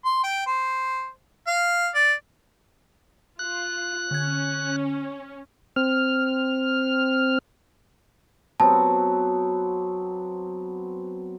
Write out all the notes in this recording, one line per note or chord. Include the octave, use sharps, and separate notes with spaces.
C6
G5
C5
F5
D5
F4 F#6
D3 C#4 G#6
C4 F6
F#3 B3 C4 A5